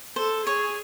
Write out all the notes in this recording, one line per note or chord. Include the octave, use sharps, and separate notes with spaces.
A4 C5
G#4 C#5